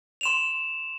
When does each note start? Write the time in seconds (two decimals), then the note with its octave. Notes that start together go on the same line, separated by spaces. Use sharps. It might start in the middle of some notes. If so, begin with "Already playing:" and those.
0.21 C6 E7 F7